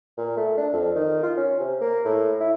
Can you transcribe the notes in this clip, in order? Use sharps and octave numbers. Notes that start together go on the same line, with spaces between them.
A#2
A3
D4
F2
D#3
F4
C#4
C3
A#3
A2
E4